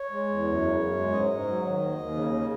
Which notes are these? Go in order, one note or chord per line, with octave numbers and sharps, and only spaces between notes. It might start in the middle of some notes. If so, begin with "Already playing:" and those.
Already playing: C#5
G#3
E2
F#2
C#3
F#2
G#3
G#2 D#5
G#2
F#3
D#3
D#2
D#2
C#3
C#3